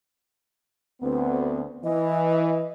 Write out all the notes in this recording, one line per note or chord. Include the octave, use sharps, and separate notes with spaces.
D2 B3 C4
E3 D#5